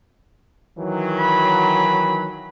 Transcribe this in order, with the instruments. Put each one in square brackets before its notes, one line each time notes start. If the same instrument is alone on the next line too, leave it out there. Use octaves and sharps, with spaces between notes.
[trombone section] D#3 E3 F#3
[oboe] B5